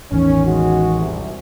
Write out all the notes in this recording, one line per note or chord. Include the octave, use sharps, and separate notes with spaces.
A1 E2 D#3 C#4
C#2 G#3 F#4
C2